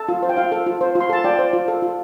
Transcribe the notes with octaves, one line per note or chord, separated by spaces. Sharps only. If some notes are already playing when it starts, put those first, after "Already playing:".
Already playing: A4 A5
F4
C5
G5
F4 F5
A4
F4
C5
F4
C6
A4 A5
F4 D5 G5
C5
F4
A4
F4